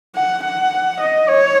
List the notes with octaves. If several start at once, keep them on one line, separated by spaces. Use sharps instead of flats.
F#5
F#5
D#5
C#5